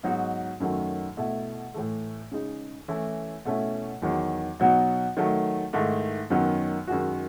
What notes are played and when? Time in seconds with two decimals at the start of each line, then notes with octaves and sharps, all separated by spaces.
0.03 G#2 F#3 B3 D#4 F#4
0.60 F#2 D#3 F#3 A3
1.17 B2 A3 E4
1.74 A2 E3 A3
2.32 C#3 G#3 D#4
2.88 E3 A3 C#4 E4
3.45 B2 A3 C#4 E4
4.02 E2 D#3 F#3
4.60 B2 F#3 B3 D#4
5.17 D#3 F#3 A3
5.73 G#2 D#3 A3 E4
6.30 F#2 D#3 F#3 B3
6.87 F#2 D#3 G#3 D#4 F#4